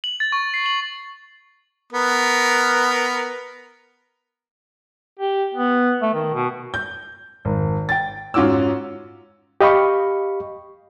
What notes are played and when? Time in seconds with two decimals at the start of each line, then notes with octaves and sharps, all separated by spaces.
0.04 F#7
0.20 A6
0.32 C#6
0.54 C7
0.66 F#7
1.93 B3 A#4
5.19 G4
5.54 B3
6.02 A3
6.14 D#3
6.34 B2
6.74 G6
7.45 G#1
7.89 G5 A6
8.34 G#2 C#4 F4 F#4 D6 E6
9.61 G4 D#5 F5 B5 C#6